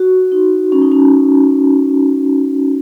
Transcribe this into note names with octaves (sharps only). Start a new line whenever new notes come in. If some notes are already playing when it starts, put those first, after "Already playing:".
Already playing: F#4
D#4
C#4
D#4
C#4